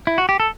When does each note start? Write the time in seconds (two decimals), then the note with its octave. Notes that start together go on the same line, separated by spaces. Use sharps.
0.07 E4
0.18 F#4
0.29 G4
0.40 A4